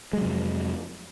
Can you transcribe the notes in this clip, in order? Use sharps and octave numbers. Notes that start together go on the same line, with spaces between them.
F2 C3 F#3 G#3